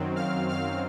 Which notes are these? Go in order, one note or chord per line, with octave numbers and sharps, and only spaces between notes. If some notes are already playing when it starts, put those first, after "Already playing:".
Already playing: F#2 D#3 F#3 C4
F5 F6
F5 F6